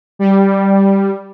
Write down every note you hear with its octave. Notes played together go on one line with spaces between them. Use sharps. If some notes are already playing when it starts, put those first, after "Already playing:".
G3